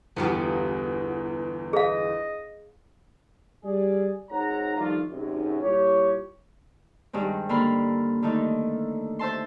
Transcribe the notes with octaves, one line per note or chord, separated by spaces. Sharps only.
G1 E2 B3 F4 G4
G#4 D#5 F5
G3 G#4 D5
G#1 G#2 C#5 F#5 A#5
D#3 F3 G3 A3 D4 F4
G#1 F#2 C3
A#2 G3 E4 G4 C#5
G2 D#3 G#3 C4
D3 A#3 A#4 B5 C6
D3 D#3 A3 D#4
C5 E5 A5 C6